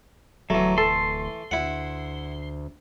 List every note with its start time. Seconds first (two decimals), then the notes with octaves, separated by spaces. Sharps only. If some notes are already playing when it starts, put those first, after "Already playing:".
0.50 D1 E3 F#3 A3
0.78 A4 C6
1.51 D2 E4 F#5